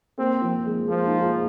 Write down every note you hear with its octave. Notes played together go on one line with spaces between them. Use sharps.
A#3 C4
F3
G#3
F3 A#3
D#4
G#4
F4